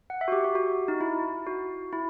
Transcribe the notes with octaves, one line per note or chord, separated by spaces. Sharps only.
F#5
E5
F#4
G4
F#4
F#4
D#4
E4
F#4
E4